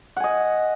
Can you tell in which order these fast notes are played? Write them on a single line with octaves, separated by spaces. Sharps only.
F#5 G#5 D#5